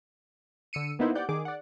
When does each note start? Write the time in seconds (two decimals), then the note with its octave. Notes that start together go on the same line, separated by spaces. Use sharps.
0.73 D3 E6 C#7 D#7
0.99 A#3 B3 D#4 E4 C5
1.15 G4 D5 F#5 G6
1.29 D#3 G#4 D6
1.45 D5 F#5